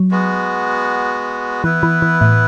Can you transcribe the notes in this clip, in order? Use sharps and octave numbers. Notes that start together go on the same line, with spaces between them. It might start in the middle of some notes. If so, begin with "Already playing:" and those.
Already playing: F#3
G#3 B3 F#4
E3 B3 E4 B4
E3
E3
A2